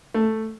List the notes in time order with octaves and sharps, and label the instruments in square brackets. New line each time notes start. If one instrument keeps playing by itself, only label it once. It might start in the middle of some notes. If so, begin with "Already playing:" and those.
[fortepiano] A3